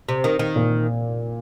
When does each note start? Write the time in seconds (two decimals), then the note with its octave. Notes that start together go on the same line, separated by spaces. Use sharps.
0.09 C3
0.24 D#3
0.39 D#3
0.56 A#2